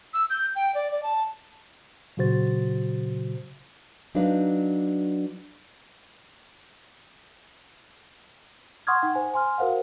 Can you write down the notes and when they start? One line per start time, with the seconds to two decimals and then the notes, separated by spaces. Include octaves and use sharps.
0.14 E6
0.30 G6
0.56 G5
0.75 D5
0.92 D5
1.03 A5
2.17 A#2 C#3 F#3 F#4 C5 A6
4.15 F#3 D4 D#4 B4 F5
8.87 F#5 C6 C#6 D#6 F6 G#6
9.03 D#4 F#5 G5
9.15 C5 G#5
9.34 G#5 C6 F6
9.58 F#4 A#4 C5 F5 F#5